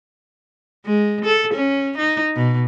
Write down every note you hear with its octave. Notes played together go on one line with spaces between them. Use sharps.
G#3
A4
C#4
D#4
B2